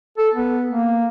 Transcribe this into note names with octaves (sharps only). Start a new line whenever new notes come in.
A4
B3
A#3